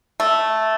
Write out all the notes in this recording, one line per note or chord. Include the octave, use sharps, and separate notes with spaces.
A3